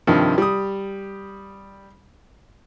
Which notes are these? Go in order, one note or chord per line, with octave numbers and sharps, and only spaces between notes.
G2 C3 D#3 F3
G3 D#6